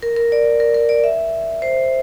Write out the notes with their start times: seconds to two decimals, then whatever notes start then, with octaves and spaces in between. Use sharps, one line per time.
0.03 A#4
0.16 A#4
0.32 D5
0.60 A#4
0.74 A#4
0.89 D5
1.04 E5
1.62 C5